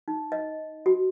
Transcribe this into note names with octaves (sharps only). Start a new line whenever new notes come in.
D#4
D#5
F#4